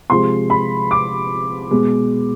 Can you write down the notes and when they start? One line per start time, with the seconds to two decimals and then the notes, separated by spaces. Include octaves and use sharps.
0.10 C3 F3 G#3 C6
0.50 B5
0.91 D6
1.71 B2 G#3